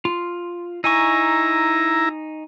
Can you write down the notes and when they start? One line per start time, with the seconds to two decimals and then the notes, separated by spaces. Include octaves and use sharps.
0.05 F4
0.84 D#4 E4 G#5 A#5 C#6